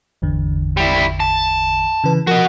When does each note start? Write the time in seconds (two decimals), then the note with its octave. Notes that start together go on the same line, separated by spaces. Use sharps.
0.22 G#1 E2 D3
0.77 G3 E4
1.20 A5
2.04 C#3 E3 B4
2.27 F3 F#4 A#4 D#5